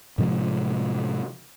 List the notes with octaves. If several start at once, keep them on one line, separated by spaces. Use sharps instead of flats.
A2 C3 F3 G#3